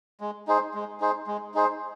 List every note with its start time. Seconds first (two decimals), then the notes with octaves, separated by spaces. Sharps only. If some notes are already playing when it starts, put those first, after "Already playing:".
0.21 G#3
0.47 D#4 G#4 C5
0.74 G#3
1.00 D#4 G#4 C5
1.27 G#3
1.54 D#4 G#4 C5